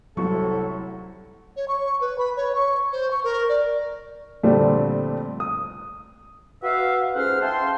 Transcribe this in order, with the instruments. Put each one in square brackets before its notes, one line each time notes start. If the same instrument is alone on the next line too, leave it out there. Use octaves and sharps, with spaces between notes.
[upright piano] C2 C#6 [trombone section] A2 C3 E4 [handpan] F#3 [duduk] A4
[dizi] C#5
C#6
B4
B5
C#5
C#6
C5
C#6
A#4
D5
[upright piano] F2 A#2 D3 G3 A3 C4
D#6
[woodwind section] F#4 B4 E5 F5
F2 G#2 C#4 C5 F#5 F6
E5 F5 G5 A5 C6